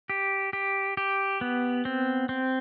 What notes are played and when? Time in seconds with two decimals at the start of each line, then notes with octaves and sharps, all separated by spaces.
0.10 G4
0.53 G4
0.97 G4
1.41 B3
1.85 C4
2.29 C4